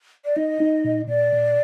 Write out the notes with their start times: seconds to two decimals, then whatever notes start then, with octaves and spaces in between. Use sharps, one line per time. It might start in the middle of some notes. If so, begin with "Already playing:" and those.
0.25 D5
0.36 D#4 D#5
0.60 D#4
0.84 A#2
1.08 A#2 D5
1.32 A#2